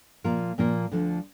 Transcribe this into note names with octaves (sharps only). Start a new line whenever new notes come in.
A#2 F3 A#3 F4 A#4
A#2 F3 A#3 F4 A#4
D2 D3 F3